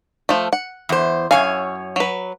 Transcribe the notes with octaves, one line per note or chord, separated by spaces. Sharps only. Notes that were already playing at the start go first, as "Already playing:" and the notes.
F3 A3
F#5
E2 C5
F#2 C#5 F5 G#5
F#3 B4